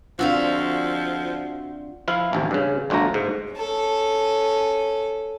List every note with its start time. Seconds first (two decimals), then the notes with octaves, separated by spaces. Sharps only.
0.19 F3 C4 D4 F4 F#4 E5 F5
2.08 F3 E4 F5
2.33 A1 D#2 C3
2.51 G2 C#3
2.90 G1 D2 F3 A3 A#5
3.14 G#2
3.53 C#4 A4